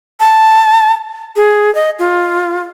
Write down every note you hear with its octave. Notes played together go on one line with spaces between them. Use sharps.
A5
G#4
D#5
F4